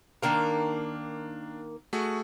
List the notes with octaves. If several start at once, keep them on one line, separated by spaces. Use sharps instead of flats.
D#3 A#3 D4 A#4 F5
A3 F#4 G#4